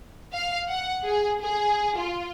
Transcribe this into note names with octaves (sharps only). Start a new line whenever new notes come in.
F5
F#5
G#4
G#4
F4